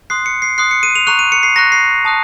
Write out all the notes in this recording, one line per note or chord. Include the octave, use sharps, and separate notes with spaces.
C6 D#6 F#6 C7
C#7
C7
C6 D#6 F#6 C7
C#7
D#7
F7
A#5 C#6 F#6 F7
D#7
C#7
C7
A#5 C#6 F#6 A#6
C7
A5 D#6 F#6